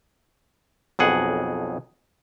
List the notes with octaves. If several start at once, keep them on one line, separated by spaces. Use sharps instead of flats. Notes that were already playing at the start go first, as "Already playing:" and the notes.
B1 F2 G#4 F#5